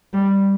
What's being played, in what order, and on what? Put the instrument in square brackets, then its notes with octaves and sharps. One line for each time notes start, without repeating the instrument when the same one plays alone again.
[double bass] G3